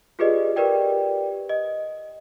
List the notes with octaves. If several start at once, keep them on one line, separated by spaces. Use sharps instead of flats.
F4 G4 G#4 B4 D5 D#5
G4 A#4 B4 D5 G5
D#5